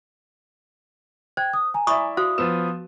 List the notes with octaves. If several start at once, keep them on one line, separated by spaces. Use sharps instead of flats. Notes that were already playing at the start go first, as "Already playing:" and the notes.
C5 G5 G#6
D#6
G#5 A#5
E4 D5 E5 B5 C#6 D#6
F#4 C5 F5 D#6
F3 B3 B4 E7